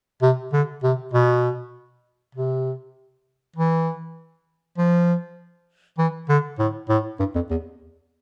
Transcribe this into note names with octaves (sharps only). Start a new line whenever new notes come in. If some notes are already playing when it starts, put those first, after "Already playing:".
C3
D3
C3
B2
C3
E3
F3
E3
D3
A2
A2
G2
F2
E2